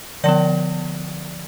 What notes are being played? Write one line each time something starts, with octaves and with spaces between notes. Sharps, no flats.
D3 F3 B3 D5